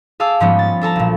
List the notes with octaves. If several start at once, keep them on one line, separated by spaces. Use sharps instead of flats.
G#4 F5 A5 D6 E6
G#2 F3 G3 G#3 B3 C#4
A6
D4 A4 A5 A#5
B1 A#2